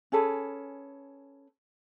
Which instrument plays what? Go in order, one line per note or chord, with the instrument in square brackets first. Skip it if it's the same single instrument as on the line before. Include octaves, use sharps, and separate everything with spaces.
[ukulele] C#4 G#4 A4 B4